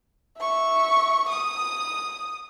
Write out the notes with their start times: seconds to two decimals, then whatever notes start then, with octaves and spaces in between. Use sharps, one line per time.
0.38 E5 C#6
1.29 D#6